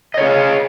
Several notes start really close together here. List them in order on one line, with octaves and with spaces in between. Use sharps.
D#5 C#5 G#4 F5